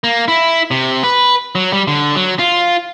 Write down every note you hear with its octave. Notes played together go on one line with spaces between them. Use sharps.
A#3
E4
C3
B4
F#3
G3
D3
F#3
F4